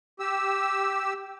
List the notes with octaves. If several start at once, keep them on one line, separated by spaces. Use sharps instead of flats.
G4 E6